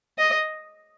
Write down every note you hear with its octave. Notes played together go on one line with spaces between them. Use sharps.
D#5